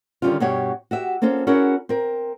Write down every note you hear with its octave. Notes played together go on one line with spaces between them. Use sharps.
D3 D#3 G3 C#4 D4 F4
G2 B2 F#4 G4 C#5
F#4 G4 E5
A#3 C4 C#4 F4 A4 C5
C#4 E4 F#4 G#4 A#4
C4 A#4